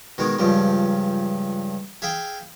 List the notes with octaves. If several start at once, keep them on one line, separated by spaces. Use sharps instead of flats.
B2 D#3 G#3 D#4
C#2 G2 F3 G3
G#4 E5 F5 G5